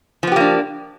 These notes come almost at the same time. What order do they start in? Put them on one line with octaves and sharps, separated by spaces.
F3 B3 G4 A#3 D4